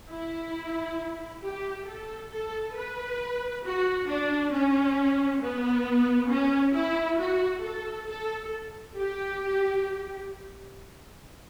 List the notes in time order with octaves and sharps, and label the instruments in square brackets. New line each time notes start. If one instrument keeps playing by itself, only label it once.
[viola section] E4
G4
A4
A4
B4
F#4
D4
C#4
B3
C#4
E4
F#4
A4
A4
G4